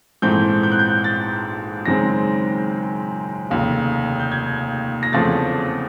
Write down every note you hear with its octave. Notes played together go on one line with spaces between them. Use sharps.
A#1 G#2 E3 A3 C4 G6
G6
F#6
G6
A6
F#1 F#2 D#3 G#3 C4 A#6
F1 D#2 C#3
G6
G#6
A#6
E2 C#3 F3 A3 C4 A6